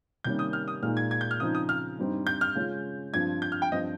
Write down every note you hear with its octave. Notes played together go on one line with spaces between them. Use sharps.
C3 D#3 G3 A#3 C#4 G6
D#6
F6
D#6
A#2 G#3 D#4 F6
G#6
G#6
G6
F6
C#3 F3 C4 D#4 D#6
D#6
F6
G2 G3 C4 D#4
G6
F6
C#3 G#3 C#4 F4
G2 F3 C4 G#6
G6
F6
G5
G2 F3 C4 F4 D#5